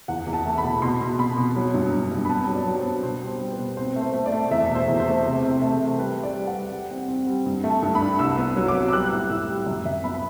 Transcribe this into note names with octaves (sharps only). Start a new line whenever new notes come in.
E2 F#5
E2
A5
A3
B5
B2
B2 C6
B2
B2 B5
B2
F#3
G2
G2
G2
B5
B3 A5
F#3
D5
F#3
C5
B3
B2 C5
G3
C5
G3
B4
B2
C4 C5
A3
C5
A3
D5
A3
E2 E5
B2
C5
E2
C5
A3
C3
C3
A3
C3
G3 B4
G3
D5
G3
F#5
G3
G3
C4
C4
G3
G2
A3
A5
G2
B5
D4
C2 E6
B3
F#3
D6
B3
E6
G3 F#6
A2
A2 E6
G3
F#2
F#2 E5
B3 B5
B5